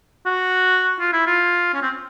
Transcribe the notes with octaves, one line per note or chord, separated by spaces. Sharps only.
F#4
F4
E4
F4
C#4
C4